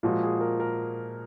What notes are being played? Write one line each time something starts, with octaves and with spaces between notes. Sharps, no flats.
A#2 F3 G#3 F#4
G#4
A#4
A#4